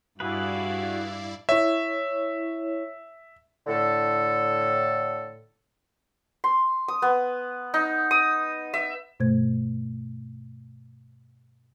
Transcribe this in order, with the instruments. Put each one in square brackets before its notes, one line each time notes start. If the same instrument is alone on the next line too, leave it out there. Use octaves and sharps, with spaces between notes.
[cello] G2 F5 [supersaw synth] E4 D5 [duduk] F#4 [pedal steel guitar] G#4 B4
[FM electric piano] E4 C#5 [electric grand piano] E5
[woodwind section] A2 D3 A4
[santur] C6
D#6
B3
D#4
D#6
E5
[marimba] G2 B2 A3 C5 G#6